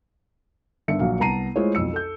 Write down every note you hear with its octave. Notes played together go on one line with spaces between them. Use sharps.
G1 D3 D#3 E5 C#7
A#1 F#3 F5
C2 B3 A5 A#5 C7 D#7
G#3 A3 E4 F4 C5 C#5
B1 F2 E6 C#7
A4 G6